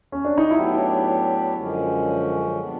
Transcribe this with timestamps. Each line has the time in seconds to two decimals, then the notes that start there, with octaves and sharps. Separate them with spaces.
0.12 C#4
0.25 D4
0.38 D#4
0.50 A2 F#3 B3 D4 E4 G4
1.55 F#2 D3 F3 G#3 C#4
2.58 A#2 G3 B3 D4